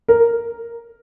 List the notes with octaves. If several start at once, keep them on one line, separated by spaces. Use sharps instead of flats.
A#4